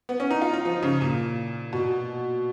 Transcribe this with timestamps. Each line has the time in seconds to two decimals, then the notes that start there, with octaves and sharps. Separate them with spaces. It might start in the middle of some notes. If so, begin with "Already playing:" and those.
0.09 B3
0.20 C#4
0.31 D#4
0.42 F4
0.54 D#4
0.65 F3
0.83 C#3
1.01 A#2
1.73 B2